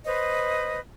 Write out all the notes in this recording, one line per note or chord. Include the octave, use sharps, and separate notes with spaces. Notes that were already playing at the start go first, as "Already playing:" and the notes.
B4 C5 D#5